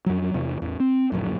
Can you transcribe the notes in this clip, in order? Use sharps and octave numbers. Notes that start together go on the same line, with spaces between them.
F2 F#3
E2 C3
A1 E2
C4
D1 A#1 F#2